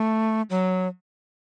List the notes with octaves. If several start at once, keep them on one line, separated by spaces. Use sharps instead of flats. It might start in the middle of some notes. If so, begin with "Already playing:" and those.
Already playing: A3
F#3